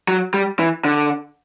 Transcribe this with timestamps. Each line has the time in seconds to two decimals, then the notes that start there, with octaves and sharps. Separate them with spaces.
0.08 F#3
0.34 G3
0.59 E3
0.85 D3